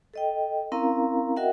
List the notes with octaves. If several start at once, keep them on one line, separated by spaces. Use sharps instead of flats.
A4 D#5 G5
C4 C#4 E4 A#4 F5 A#5
F#4 A#4 D#5 E5 F#5 G5